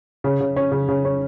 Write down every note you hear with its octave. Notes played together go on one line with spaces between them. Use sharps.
C#3
C#3
C#4
C#3
C#3
C#4